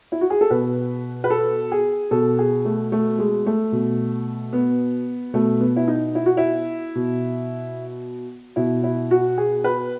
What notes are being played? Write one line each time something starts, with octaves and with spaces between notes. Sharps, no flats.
E4
F#4
G#4
A4
B2 B4
B4
A4
G#4
B2 A4
G#4
A3
A3
G#3
A3
B2
B3
B2 A3
B3
E4
D#4
E4
F#4
E4
B2
B2 E4
E4
F#4
G#4
B4